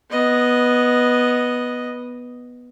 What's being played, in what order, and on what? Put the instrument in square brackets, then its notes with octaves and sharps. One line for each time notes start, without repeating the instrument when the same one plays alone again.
[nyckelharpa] B3 D#5